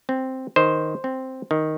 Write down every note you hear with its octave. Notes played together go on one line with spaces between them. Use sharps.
C4
D#3 C5
C4
D#3